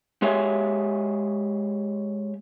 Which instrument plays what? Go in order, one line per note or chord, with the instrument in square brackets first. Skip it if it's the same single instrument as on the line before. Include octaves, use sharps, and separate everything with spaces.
[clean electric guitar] G#3 G4 C#5 E5 F5 G#5